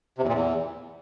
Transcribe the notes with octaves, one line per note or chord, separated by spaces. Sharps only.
C3
E2
A#2
E2